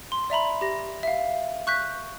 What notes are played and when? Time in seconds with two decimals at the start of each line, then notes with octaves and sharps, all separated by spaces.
0.12 C6
0.30 D5 E5 A#5 B5
0.61 G4 A#6
1.03 E5 F5
1.67 C#6 F#6 G6 B6